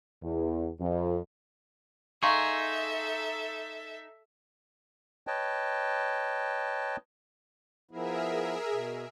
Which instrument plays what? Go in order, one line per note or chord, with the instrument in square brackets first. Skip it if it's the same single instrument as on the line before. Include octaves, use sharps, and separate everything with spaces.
[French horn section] E2
F2
[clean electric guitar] D#4 G#4 [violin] A4 E5 [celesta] F5 C6 C#6
[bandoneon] B4 C#5 D#5 G5 A5
[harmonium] F3 B3 E4 [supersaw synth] G#4 A#4 E5
[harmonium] B2